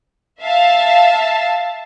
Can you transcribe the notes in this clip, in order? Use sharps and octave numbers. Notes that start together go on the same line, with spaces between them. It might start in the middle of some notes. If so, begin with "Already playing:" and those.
E5 F5 A5